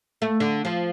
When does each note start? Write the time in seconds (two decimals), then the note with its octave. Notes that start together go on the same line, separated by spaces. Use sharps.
0.22 A3
0.40 D3
0.65 F3